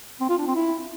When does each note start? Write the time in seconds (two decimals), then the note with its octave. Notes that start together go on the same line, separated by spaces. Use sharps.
0.21 C4
0.29 F4
0.38 D4
0.47 C4
0.55 E4